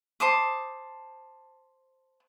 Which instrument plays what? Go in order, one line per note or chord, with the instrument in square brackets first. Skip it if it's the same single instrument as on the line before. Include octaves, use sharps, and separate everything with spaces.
[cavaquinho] C5 A5 D6 D#6